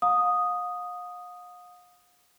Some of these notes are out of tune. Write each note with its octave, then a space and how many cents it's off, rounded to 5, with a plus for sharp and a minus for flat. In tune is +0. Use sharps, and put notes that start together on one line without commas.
F5 +40 A#5 +0 D#6 +0